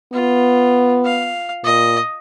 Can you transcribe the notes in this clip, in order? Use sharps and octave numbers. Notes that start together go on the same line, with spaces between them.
B3 F4
F5
A#2 D#5